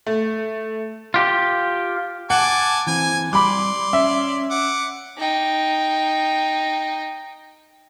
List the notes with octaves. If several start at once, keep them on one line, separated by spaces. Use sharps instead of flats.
A3
F4 G4
F#5 G#5 A5 D6
E3 C4 G#5
G3 D5 B5 C6 D6
C#4 E5
F#5 D6
D#4 G5